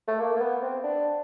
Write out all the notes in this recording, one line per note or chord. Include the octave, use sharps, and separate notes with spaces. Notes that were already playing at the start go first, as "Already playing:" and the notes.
A3
A#3
A#3
B3
C4
D4